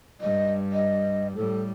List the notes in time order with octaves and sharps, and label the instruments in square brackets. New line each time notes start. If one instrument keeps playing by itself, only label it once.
[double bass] G2 G3 [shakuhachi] D#5
[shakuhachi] D#5
[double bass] A2 G3 [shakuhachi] A4